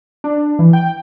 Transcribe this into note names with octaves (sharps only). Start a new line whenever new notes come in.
D4
E3
G5